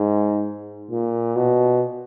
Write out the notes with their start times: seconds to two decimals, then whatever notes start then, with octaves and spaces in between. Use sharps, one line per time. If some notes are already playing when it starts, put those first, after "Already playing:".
Already playing: G#2
0.91 A#2
1.36 B2